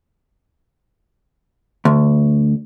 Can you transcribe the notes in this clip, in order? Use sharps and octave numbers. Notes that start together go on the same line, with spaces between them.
D2